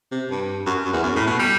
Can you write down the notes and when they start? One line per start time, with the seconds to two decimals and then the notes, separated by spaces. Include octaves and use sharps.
0.12 C3
0.30 G2
0.66 F#2
0.85 F#2
0.93 E2
1.03 F#2
1.15 A2
1.27 B2
1.39 G3